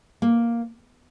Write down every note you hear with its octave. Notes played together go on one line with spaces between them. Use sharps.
A#3